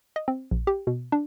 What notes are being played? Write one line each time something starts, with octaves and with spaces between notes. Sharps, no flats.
D#5
C4
A#1
G4
B2
D4